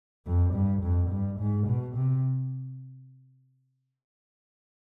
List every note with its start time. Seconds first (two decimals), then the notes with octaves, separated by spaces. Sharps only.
0.26 F2
0.54 G2
0.82 F2
1.11 G2
1.39 G#2
1.67 B2
1.96 C3